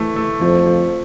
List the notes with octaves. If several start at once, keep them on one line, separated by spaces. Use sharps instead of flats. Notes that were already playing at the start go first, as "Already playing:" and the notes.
Already playing: E3 A3
A3
F2 F3
F3